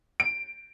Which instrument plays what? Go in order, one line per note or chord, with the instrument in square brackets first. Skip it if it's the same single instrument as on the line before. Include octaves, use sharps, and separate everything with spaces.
[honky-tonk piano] D7